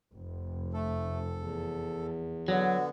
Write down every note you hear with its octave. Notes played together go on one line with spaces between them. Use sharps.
F1
A3 A4
E2
D3 F#3 B3